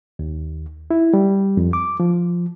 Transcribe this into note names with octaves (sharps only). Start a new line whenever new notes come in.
D#2
E4
G3
F2
D6
F3